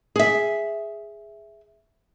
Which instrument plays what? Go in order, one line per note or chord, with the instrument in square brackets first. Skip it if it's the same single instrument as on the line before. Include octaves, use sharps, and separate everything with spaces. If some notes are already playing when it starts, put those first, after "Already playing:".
[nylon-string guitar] G#4 E5